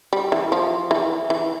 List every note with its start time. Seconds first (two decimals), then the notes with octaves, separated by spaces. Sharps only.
0.13 G3
0.32 E3
0.52 F3
0.91 E3
1.30 E3